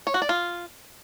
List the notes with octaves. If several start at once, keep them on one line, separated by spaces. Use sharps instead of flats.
C#5
F#4
D5
F4